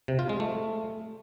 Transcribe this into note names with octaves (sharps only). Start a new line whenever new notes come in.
C3
F4
G#3
A3